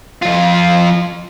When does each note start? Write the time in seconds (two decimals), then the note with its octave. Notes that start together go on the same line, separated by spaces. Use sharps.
0.22 F2 F4